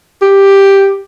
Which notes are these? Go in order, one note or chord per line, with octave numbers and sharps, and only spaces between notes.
G4